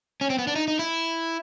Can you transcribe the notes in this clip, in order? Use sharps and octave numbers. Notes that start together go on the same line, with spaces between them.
C#4
C4
B3
D4
D#4
D#4
E4